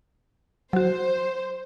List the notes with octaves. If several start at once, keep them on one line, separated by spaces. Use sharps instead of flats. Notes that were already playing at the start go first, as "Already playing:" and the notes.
F#3 F#4 C5